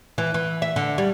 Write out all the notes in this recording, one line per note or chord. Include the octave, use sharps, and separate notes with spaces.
E3
E3
E5
D3
G3